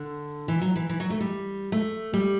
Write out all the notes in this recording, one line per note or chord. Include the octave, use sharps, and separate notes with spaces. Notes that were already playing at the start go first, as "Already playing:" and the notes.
Already playing: D3
E3
F#3
E3
E3
F#3
A3
G3
A3
G3